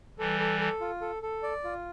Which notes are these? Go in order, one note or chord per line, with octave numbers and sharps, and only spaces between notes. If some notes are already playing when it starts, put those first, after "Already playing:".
E3 G3 A4
A4
A4
F4
A4
A4
D5
F4